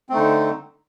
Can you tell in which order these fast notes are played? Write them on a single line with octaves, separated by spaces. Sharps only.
C4 A3 D#4 D3